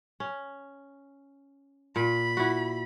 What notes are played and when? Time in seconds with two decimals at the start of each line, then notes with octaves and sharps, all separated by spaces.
0.20 C#4
1.96 A#2 B5
2.37 E4 F#4